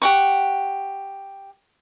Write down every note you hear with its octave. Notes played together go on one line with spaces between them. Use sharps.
G4 F#5 C#6